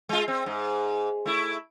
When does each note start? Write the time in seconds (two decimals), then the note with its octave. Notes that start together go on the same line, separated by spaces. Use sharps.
0.09 G#3 F4
0.28 C4
0.46 G#2
1.26 A3 E4